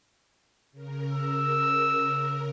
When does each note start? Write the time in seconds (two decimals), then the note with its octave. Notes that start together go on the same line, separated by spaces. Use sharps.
0.72 C#3 A#4
1.12 E6